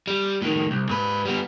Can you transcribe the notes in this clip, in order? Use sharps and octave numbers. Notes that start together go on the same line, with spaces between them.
G3
A2 D#3
C2
G#2 B4
G3 B3